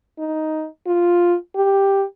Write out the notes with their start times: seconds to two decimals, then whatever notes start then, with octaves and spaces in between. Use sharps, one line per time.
0.19 D#4
0.87 F4
1.56 G4